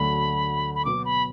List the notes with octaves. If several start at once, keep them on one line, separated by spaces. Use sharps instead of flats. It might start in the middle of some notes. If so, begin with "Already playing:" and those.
Already playing: D2 D3 F#3 A3 F#4 B5
B5
B2 F#3 B3 D6
B5